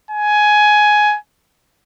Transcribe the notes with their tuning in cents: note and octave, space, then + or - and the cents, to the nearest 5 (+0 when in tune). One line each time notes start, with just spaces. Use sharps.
G#5 +10